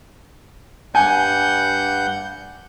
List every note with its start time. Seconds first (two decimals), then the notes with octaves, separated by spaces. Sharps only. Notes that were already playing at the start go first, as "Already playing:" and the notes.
0.95 G2 F#5 G#5 G6